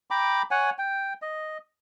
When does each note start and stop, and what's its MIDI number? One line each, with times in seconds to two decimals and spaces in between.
0.10 0.42 79
0.10 0.42 82
0.10 0.42 83
0.10 0.42 86
0.51 0.70 73
0.51 0.70 78
0.51 0.70 80
0.78 1.13 79
1.22 1.58 75